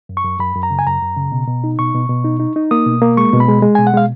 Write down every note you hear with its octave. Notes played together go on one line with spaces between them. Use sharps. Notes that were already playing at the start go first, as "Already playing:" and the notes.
F#2
C#6
F#2
F#2 B5
F#2
A#5
C#3
G#5
F#2 A#5
F#2
C#3
B2
B2
D#4
B2 C#6
B2
B2
D#4
D#4
D#4
A#3 D#6
B2
A#3
G#3 C#6
B2
B5
G#3
G#3
B2 G#5
F#5
G#3 F5